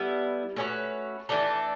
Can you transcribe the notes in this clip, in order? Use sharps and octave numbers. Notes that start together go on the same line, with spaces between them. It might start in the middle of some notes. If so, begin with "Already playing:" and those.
Already playing: G3 B3 E4 A4
A3 C#4 F#4 B4
E3 A3 D4 A4